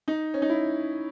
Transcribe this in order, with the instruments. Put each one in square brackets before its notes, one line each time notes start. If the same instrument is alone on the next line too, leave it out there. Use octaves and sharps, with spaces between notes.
[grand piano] D#4
C#4
D#4
E4